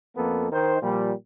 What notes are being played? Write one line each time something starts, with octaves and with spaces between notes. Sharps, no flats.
F2 A#3 B3 A4
D#3 C5
A#2 F3 G3